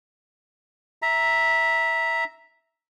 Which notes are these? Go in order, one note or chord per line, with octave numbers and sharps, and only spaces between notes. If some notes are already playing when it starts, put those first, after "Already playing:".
E5 A#5